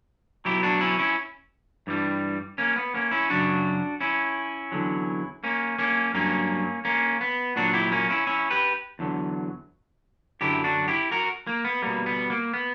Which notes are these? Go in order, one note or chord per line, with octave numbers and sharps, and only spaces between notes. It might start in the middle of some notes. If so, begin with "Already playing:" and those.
B2 F#3 E4 G4
D4 F#4
C#4 E4
C#4 E4
G2 E3 G3
A#3 C#4
B3
A#3 C#4
C#4 E4
F#2 C#3 F#3 D4 F#4
C#4 E4
E2 D3 F#3
A#3 C#4
A#3 C#4
G2 F#3 A#3 C#4
A#3 C#4
B3
A#2 F#3 D4 F#4
E4 G4
A#3 C#4
C#4 E4
C#4 E4
G4 B4
E2 D3 F#3
F#2 D3 F#3 E4 G4
D4 F#4
E4 G4
F#4 A#4
A#3
B3
B2 G3 A#3
B3
A#3
B3